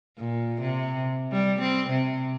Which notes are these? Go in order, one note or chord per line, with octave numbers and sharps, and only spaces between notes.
A#2
C3
G3
C4
C3